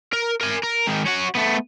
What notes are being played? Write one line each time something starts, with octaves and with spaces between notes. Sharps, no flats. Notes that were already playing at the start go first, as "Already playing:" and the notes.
A#4
A#4 G#5
A#4
G#2 D#3
C#4 F#4
A3 B3